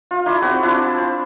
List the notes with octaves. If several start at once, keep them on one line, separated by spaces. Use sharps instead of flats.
F4 F5
D#4 E4 D5 D#5
C4 F#4 G#4
D4 E4 F4
A5
C4